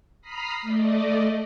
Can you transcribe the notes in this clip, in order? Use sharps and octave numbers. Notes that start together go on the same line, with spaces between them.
A#5 B5 D#6 F6 B6 C7
A3 D5 D#5